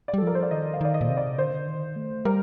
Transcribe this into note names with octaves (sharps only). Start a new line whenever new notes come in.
D5
G3
A4
F3 A#4
C5
D5
D#3 D#5
F5
D#3 D5
D#5
A#2
C3
D5
D3 C5
D#3
A3
G3 A#4